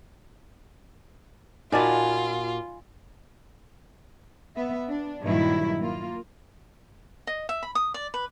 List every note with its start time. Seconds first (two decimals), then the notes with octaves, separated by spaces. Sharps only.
1.72 A#2 D#4 F4 F#4 D5 G#5 A5 B5
4.55 B3 E5
4.87 D4
5.23 G2 A#2 D#3 F#3 E4
5.80 A#3 F4
7.27 D#5
7.49 E5
7.63 B5
7.75 D#6
7.94 D5
8.14 B4